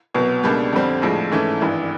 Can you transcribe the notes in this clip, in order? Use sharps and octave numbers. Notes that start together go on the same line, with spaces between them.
C2 B2 F#3 B3
C#2 B2 G3 A#3 D4
F2 D3 G3 C4
A#1 A2 F3 G#3
G#2 E3 A3 C#4 E4
G#1 G2 E3